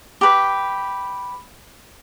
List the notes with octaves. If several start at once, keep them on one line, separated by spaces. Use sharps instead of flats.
G4 B4